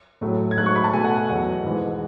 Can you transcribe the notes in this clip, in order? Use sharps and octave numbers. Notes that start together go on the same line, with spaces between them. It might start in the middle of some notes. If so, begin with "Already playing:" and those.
A2 F#3 A3
G#6
G#2 F#3 A3 F#6
C#6
B5
A5
B2 A3 G#5
F#5
F#5
E2 B2 F#3 F#5
G#2 E3 G#3